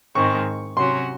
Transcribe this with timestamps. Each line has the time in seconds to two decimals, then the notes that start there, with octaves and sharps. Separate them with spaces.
0.15 G#2 D#3 G#3 C4 C#6
0.77 C3 F#3 C#4 F#4 C6